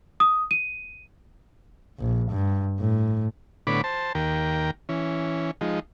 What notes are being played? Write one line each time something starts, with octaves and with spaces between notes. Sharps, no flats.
D#6
D#7
A#1
G2
A2
A2 D3 B3 C#5 B5 D6
C5 A5
D#2 A#4 G5
E3 C#4
F3 G#3 D#4